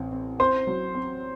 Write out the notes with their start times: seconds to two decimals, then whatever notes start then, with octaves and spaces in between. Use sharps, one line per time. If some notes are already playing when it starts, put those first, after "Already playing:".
Already playing: A1 C4
0.12 C4
0.39 C4 C5 C6
0.67 F#3
0.95 C4